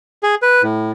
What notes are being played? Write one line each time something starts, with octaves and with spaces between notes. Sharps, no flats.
G#4
B4
A2